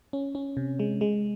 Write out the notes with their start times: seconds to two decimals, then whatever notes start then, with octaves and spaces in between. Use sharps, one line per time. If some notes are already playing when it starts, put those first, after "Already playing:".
0.13 C#4
0.35 C#4
0.57 C3
0.79 G#3
1.01 G#3